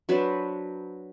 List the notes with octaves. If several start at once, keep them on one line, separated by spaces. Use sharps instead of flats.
F#3 D4 B4 C5